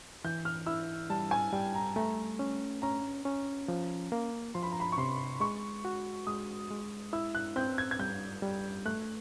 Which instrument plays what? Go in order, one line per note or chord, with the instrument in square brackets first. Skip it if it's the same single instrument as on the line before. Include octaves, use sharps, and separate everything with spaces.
[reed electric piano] E3 [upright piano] G6
[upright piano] F6
[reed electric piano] E4 [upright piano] E6
[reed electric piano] G3 [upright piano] A5
[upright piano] G#5
[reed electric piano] G3 [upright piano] G5
[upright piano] A#5
[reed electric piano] A3 [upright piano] A#5
[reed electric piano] C#4
[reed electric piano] C#4 [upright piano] A#5
[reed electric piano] C#4
F3
A#3
[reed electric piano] F3 [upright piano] C6
[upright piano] B5
A#5
B5
C#6
[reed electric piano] C3 [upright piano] C6
[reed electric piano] G#3 [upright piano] C#6
[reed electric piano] F#4
[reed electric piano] G#3 [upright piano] D#6
[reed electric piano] G#3
[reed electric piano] E4 [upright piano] E6
[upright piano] F#6
[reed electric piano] C4 [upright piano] G6
[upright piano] G#6
G#6
[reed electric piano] G3 [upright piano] G6
[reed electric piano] G3
[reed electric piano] A3 [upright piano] F#6